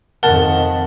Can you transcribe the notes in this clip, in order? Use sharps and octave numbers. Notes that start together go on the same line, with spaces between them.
F2 D#3 A#4 F#5 A5